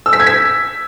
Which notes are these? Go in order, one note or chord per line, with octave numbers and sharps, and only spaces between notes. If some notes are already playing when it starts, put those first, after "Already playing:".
E6
B6
G#6
B6